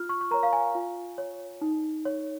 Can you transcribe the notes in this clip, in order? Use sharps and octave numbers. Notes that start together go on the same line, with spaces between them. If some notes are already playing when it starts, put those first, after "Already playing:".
Already playing: F4 F6
C#6
C#6
A#4 C#5 A#5
F5
G#5
F4
C#5
D#4
C#5